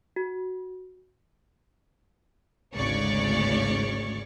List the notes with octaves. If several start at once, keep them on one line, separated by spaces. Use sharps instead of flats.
F#4
G#1 D2 C#3 C#5 D5 C#6